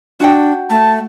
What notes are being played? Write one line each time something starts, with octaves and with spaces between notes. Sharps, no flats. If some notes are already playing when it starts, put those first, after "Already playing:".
D4 F#4 F#5 G5
A3 A5